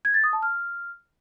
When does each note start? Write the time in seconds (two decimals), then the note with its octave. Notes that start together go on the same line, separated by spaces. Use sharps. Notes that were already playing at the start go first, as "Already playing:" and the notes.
0.05 G#6
0.14 A6
0.24 D#6
0.33 A5
0.42 F6